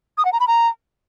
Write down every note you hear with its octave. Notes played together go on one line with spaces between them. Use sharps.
D#6
F#5
A#5
B5
A#5